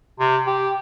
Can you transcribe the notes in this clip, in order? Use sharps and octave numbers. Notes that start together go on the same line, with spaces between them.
C3
G4